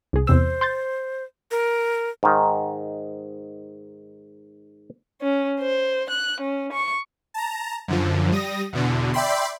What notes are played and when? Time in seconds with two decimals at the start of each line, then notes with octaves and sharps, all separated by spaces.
0.13 C2 G#4
0.27 E2 C3 C5 E6
0.61 C6 G6 A6
1.51 A#4
2.23 G#2 D#3
5.22 C#4
5.60 C5
6.10 F#6
6.41 C#4
6.73 C#6
7.34 A5 A#5
7.88 F#2 D3 F3
8.32 G3 D#6 A#6
8.73 E2 B2 D3
9.14 D5 E5 G5 B5 C6